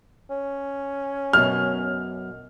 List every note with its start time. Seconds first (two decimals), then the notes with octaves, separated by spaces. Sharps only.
0.30 C#4
1.33 F#2 B2 F6